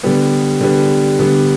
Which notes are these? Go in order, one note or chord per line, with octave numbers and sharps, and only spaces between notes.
D3 G3 B3
D3 G3 B3
D3 G3 B3